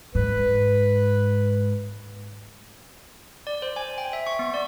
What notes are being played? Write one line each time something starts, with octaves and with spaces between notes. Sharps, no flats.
G#2 B4
D5
C5
G#5
G5
E5
C#6
B3
D5